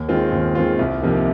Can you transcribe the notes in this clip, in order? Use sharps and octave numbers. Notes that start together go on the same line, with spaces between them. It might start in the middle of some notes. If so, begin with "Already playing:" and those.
Already playing: D#2
D#3 G#3 C4 F4
D#2
D#3 G#3 C4 F4
C2
C3 F3 A#3 D#4